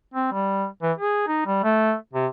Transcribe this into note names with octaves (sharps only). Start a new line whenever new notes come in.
C4
G3
E3
G#4
D#4
G3
A3
C3